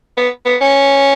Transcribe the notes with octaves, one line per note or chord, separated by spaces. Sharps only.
B3
B3
C#4